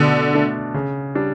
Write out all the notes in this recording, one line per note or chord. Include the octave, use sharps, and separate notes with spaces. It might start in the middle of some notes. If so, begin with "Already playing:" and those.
Already playing: B2 D3 A3 D4
A3 D4
C#3
G3 D4